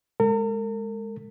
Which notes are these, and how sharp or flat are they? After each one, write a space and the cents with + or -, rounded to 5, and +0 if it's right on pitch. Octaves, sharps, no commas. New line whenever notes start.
G#3 +0 A#4 -45